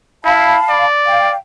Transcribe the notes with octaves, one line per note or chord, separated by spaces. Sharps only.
E4 F5 A5 B5
D5
F5 G5